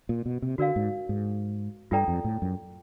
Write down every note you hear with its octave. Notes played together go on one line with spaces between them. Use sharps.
A#2
B2
C3
D3 F#4 A#4 D5 F5
G#2
G#2
G2 F4 A4 D5 G5 A#5
F2
A2
F#2